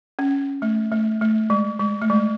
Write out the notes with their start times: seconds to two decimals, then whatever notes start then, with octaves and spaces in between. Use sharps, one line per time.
0.19 C#4
0.62 A3
0.92 A3
1.21 A3
1.50 G#3
1.79 G#3
2.02 A3
2.10 G#3